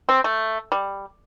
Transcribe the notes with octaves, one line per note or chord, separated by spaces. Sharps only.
C4
A3
G3